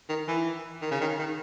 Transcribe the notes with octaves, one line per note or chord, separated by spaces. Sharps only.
D#3
E3
D#3
C#3
D#3
D#3